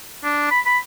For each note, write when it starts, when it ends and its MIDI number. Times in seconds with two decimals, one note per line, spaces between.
0.24 0.47 62
0.51 0.60 83
0.66 0.78 83